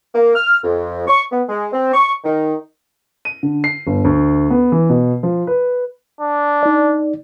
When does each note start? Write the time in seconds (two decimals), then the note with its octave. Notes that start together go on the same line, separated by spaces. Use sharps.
0.14 A#3
0.35 F6
0.63 F2
1.08 C#6
1.32 B3
1.49 G#3
1.73 C4
1.94 C#6
2.24 D#3
3.25 D#7
3.43 D3
3.64 C7
3.87 G1
4.04 D2
4.50 B3
4.72 E3
4.90 B2
5.23 F3
5.47 B4
6.21 D4
6.63 D#4 D5